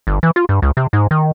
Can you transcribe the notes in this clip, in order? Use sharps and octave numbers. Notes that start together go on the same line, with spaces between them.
G1
E3
F4
G2
C#2
C3
G#2
D#3